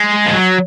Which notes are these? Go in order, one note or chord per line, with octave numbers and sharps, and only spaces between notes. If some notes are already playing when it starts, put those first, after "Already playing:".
Already playing: G#3
F3
F#3